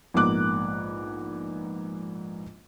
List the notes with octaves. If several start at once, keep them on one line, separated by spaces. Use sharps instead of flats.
A#1 G#2 A#3 B3 D6 F#6